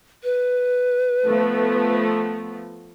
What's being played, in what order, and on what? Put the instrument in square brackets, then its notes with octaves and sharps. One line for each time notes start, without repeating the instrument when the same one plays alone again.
[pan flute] B4
[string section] F3 A3 B3